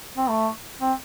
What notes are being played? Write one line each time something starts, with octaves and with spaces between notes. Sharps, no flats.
C4
A3
C4